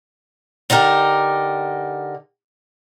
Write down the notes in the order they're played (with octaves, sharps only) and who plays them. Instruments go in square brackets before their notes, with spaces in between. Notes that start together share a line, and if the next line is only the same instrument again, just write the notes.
[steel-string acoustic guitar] D3 D#4 G4 A#4